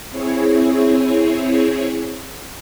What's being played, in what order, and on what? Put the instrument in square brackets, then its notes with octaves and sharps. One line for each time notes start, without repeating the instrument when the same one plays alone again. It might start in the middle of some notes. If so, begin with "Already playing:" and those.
[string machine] C4 E4 G#4 C#5